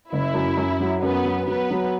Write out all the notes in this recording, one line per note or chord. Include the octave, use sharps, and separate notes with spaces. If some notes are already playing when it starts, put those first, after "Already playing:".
F#1 E4
F#2
F#2
F#3
F#2 B3 B4
F#3
F#3 B3 B4
F#3